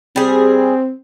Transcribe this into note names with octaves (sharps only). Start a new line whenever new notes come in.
G3 C4 G#4